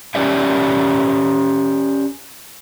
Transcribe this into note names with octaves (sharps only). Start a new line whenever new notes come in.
C#4 G4 C#5 D5 E5